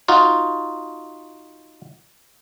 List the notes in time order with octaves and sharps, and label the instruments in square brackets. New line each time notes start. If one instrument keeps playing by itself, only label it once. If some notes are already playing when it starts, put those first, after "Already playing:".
[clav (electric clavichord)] D#4 F4 F#4